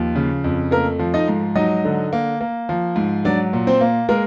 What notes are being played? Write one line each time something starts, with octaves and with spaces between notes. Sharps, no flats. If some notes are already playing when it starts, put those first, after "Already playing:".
Already playing: D#2 F3
C#3
F2
A3 A#3 A#4
F3
D#4 D#5
G#2
F#3 D#4 D#5
D3
A#3
A#3
F3
G#2
F#3 D4 D5
A#2
C4 C5
A#3
G#3 A#3 A#4